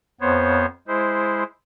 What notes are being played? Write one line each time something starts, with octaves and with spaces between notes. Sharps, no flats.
F2 B3 C5 C#5
G#3 E4 C5